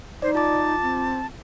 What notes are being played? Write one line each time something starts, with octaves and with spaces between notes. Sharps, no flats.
D#4 C5 D5
F4 A5 D6
C4